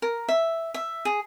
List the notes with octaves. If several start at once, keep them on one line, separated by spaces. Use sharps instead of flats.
A#4
E5
E5
G#4